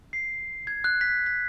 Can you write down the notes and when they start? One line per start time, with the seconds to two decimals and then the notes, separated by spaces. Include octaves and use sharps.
0.13 C7
0.67 G#6
0.84 F#6
1.01 B6
1.26 B6